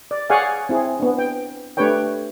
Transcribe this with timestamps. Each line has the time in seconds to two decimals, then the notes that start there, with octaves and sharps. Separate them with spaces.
0.11 D5
0.30 G#4 C#5 D5 F5 F#5 G#5
0.69 C4 E4 G#4
1.00 B3 D4
1.19 G5
1.77 A3 D4 G4 B4 C#5 G5